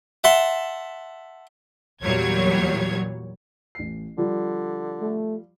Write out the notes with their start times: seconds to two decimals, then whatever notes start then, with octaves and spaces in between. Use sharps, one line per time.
0.24 E5 F#5 A5 C6
2.03 E2 A#2 F#3 G3 C#5 G#6
3.75 A1 C7
4.18 D3 F3 G3 F4
5.01 A3